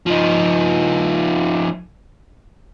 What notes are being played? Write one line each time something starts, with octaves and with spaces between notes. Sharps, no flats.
F3 D#4